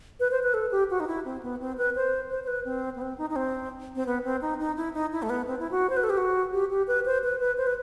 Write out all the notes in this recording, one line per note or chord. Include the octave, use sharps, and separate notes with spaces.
B4
C5
B4
A4
G4
F#4
D#4
E4
C4
B3
C4
B4
C5
C5
C5
B4
C4
B3
C4
D#4
D#4
C4
C4
B3
C4
D#4
D#4
E4
D#4
E4
A3
B3
C4
E4
F#4
C5
B4
A4
G4
F#4
G4
G4
B4
C5
B4
B4
C5
B4